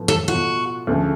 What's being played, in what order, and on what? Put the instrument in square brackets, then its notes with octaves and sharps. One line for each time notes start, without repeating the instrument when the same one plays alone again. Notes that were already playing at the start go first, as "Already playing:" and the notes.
Already playing: [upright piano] A2 F3 B3
[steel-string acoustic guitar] A4
[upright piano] B2 A3 F4 [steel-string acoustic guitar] F#4
[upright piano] D2 C#3 F3 A3